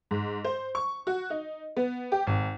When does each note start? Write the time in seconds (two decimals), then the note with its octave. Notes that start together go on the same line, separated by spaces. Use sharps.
0.11 G#2
0.44 C5
0.75 C#6
1.07 F#4
1.30 D#4
1.77 B3
2.12 G4
2.27 G#1